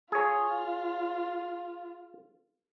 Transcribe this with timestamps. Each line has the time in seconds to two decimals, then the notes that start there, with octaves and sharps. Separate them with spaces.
0.12 F4 G#4 C#5